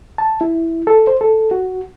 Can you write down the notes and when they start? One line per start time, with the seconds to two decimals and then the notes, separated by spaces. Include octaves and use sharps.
0.18 A5
0.41 E4
0.87 A4
1.07 C5
1.21 A4
1.51 F#4